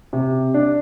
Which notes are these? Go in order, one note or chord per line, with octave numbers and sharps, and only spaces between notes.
C3
D4